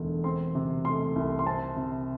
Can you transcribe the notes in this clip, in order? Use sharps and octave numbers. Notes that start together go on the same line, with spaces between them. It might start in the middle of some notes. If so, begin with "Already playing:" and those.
Already playing: E1 D2 D3
C4 C6
C3
A3 C6
C2
C6
C4 A5
C3